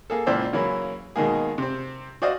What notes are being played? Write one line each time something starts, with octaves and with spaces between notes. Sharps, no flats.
A#3 G#4 A4
C#2 A#2 E3 C5 D5 E6
C#3 E3 F#3 A#3 C#4 E4
B2 D#3 G#3 A#3 G#4
C3 C4
F#4 C5 D5 D#5 F5